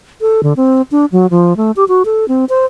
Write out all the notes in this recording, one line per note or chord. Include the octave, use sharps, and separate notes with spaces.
A4
D3
C4
D4
F#3
F3
A3
G4
F#4
A4
C4
C5